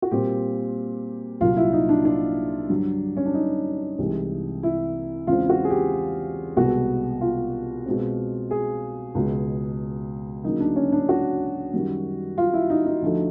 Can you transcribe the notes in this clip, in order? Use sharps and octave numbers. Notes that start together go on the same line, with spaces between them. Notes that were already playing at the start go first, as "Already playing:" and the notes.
F#4
A#2 G3 C4 G4
C2 A#2 F#3 F4
E4
D#4
D4
D4
G2 D3 F#3
C#4
D4
D#4
C2 C3 E3 G#3
E4
E2 C#3 E3 G#3 C4 F4
F#4
G#4
G4
C2 B2 G#3 B3 F#4
F4
B2 G#3 C4
G#4
C#2 B2 G#3
D2 C#3 F#3 A#3 D#4
D4
C#4
D4
F#4
F#2 D#3 G3
F4
E4
D#4
D#4
D2 D3 F3 A3